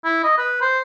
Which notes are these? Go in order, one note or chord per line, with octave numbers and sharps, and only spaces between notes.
E4
D#5
B4
C5